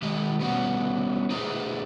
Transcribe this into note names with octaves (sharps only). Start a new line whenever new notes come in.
D#3 G#3 G4 D#5
G3 B3 C#4 F#4
E4 G#4 B4 C5 D#5 A#5